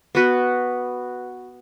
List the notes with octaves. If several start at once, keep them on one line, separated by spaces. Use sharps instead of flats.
B3 F#4 B4